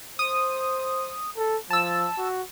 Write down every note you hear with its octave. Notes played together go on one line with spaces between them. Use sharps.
C5 D#6
A4
F3 A5 E6
F#4